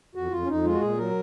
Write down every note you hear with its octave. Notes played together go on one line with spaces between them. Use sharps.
F2 F#4
F2 F4
C#4
F2 D#4
G#3 F4
F#4
A#2 G#4
F#3 A#4